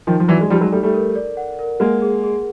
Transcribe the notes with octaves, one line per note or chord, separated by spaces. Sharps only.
D#3 F3 D#4
F3
E3 F#3 D5
G#3
F3 G3 D#4
F#3 G#3
G3 A3 A4
G3 A3
A#4
D5
F#5
A#4
G#3 A#3 F#5
G#4
G#4